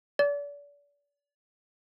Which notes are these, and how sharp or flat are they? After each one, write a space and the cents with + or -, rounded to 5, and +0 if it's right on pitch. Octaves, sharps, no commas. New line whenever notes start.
D5 -35